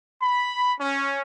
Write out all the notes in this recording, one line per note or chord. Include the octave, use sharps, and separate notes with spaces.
B5
C#4